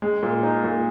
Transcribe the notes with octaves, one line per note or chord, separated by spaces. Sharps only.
G#3
A#2
D#4
A#2